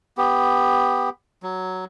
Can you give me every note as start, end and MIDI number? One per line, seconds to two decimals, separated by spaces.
0.18 1.09 59
0.18 1.09 67
1.43 1.85 54